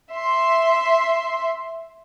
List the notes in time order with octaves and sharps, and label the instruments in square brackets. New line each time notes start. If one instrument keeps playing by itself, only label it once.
[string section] E5 C6